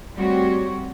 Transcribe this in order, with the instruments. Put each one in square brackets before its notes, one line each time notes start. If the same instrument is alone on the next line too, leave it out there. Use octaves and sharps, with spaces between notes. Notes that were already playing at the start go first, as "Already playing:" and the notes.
[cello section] G3 A3 C4 F#4 G4 C#5